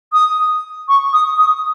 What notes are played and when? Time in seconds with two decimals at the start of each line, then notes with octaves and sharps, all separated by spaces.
0.13 D#6
0.88 C#6
1.13 D#6
1.38 D#6